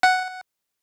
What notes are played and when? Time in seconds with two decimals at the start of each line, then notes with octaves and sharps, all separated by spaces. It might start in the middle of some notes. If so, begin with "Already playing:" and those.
0.03 F#5